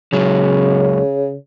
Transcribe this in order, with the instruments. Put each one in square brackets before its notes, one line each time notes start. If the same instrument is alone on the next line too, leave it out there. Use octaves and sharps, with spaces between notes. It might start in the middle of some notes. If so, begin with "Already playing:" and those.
[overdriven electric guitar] C#2 F#3 [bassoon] C#3